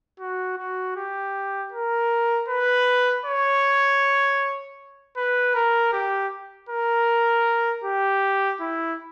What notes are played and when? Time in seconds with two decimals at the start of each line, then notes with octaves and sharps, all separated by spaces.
0.20 F#4
0.57 F#4
0.96 G4
1.72 A#4
2.48 B4
3.25 C#5
5.17 B4
5.55 A#4
5.93 G4
6.69 A#4
7.84 G4
8.61 E4